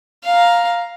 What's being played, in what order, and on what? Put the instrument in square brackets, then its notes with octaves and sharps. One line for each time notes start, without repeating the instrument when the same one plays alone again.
[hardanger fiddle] F5 A#5